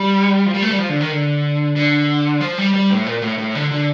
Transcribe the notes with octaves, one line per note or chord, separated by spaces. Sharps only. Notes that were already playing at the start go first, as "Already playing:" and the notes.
Already playing: G3
F3
G3
A3
G3
F3
D3
D#3
D3
D3
F3
G3
G3
A2
A#2
A2
A2
D3
D3